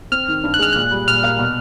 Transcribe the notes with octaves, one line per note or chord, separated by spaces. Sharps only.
C4 F6
D#3
G2
F#6
G#3 F6
A#2 F#6
G3
A#2 F6
A#3
B2